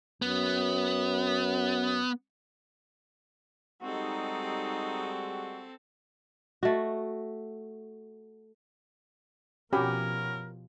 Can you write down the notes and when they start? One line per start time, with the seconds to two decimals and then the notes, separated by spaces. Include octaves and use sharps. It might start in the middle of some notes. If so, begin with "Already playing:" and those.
0.22 F#2 B3
3.82 G3 G#3 C4 D#4 F#4 A4
6.63 A3 F#4
9.73 B2 F3 C#4 F#4 G4 A#4 B5